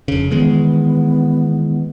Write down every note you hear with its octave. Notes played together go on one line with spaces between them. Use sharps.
F1 C#3
D#3 E3 G#3 B3